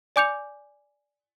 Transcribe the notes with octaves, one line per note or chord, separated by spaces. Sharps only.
D5 G#5 D6 G6 C#7 F7